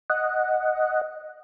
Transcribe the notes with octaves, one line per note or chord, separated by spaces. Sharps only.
D#5 F#5